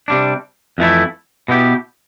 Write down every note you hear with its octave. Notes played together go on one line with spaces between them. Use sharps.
C3 G3 D4
F2 E3 A3 E4
B2 B3 E4 G4